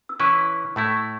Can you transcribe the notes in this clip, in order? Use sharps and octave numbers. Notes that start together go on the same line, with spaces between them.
E6
E3 C#4 E4 B4 C#6 F#6
A2 A3 E4